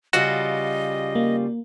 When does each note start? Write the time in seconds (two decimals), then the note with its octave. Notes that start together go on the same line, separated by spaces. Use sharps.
0.13 C#3 G3 F4 F#4 D#5
1.15 A#3